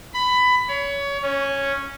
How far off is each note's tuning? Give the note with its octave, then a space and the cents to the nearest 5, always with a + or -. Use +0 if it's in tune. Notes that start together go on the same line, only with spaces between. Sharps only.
B5 +15
C#5 +25
C#4 -5